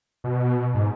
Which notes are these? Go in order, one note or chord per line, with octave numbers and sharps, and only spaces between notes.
B2
G#2